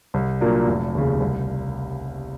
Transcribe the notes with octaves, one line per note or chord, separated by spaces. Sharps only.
C2
A#2 F#3 A#3 D4
F1
D#2 C#3
C2